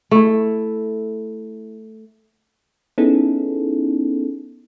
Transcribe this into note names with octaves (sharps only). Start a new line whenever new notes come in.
A3 E4
B3 C#4 D#4 E4 G#4 A4